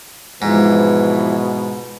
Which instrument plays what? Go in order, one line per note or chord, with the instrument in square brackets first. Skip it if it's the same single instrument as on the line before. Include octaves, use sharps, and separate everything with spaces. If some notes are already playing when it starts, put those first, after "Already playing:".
[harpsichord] G#2 [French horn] B2 [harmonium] E3 F3